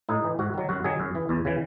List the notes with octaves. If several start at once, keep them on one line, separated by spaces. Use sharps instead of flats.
A2 D#4
E3
G#2 F#4
D#3 F#3
F#2 F#4
D#3 F#3 G#4
F#2
E3
E2
C#3 E3